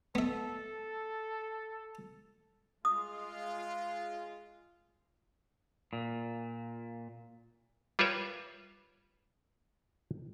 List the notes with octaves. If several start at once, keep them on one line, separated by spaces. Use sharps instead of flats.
B3 A4 E5
G#3 F4 D#6
A#2
G3 F4 A#4 B4 C#5 E5